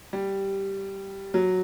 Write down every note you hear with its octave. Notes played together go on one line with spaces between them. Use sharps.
G3
F#3